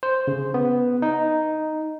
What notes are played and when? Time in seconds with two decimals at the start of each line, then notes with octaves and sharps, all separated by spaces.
0.03 C5
0.27 C#3
0.54 B3
1.02 D#4